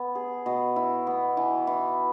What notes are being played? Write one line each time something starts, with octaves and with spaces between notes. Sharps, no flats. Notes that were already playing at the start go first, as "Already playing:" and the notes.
Already playing: B3
G#4
B2
E4
B3
E3
E3